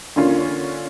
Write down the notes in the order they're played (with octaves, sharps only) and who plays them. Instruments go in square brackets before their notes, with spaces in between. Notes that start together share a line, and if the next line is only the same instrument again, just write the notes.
[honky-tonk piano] D3 A#3 C#4 F4